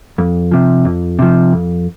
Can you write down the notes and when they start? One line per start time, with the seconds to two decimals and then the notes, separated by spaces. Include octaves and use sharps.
0.18 F2
0.51 C3 F3
0.85 F2
1.19 C3 F3
1.53 F2